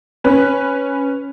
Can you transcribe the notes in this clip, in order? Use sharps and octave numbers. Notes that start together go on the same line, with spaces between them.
C#4 B4